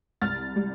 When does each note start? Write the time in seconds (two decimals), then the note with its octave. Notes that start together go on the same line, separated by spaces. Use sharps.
0.22 C2 F6 A6
0.56 G3